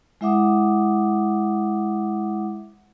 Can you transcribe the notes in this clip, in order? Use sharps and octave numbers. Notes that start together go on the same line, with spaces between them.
G#3 E4 E5 F#5 D6 D#6